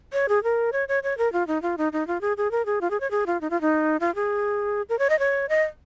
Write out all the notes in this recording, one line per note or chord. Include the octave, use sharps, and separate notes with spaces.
C#5
G#4
A#4
C#5
C#5
C#5
A#4
F4
D#4
F4
D#4
D#4
F4
G#4
G#4
A#4
G#4
F4
G#4
C#5
G#4
F4
D#4
F4
D#4
F4
G#4
A#4
C#5
D#5
C#5
D#5